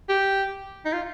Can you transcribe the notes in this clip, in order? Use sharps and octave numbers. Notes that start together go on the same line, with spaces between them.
G4
D#4
F4